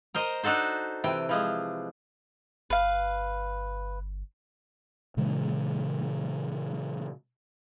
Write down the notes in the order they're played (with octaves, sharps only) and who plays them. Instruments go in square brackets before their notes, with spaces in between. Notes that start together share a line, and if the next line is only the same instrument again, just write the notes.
[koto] A#4 C5 D#5
D4 D#4 F#4 A4 C5
C3 E3 G5
E3 F3 G#3
[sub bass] G1 [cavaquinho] B4 F5
[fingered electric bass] A#2 C#3 E3 G#3